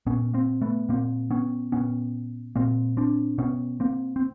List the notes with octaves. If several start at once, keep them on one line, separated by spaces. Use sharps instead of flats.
A#2 B3 C#4
A#3 C4
A3 B3
A#2 A#3 C4
B3 C#4
A#2 B3 C#4
A#2 A#3 C4
C4 D4
B2 B3 C#4
A#3 C4
C4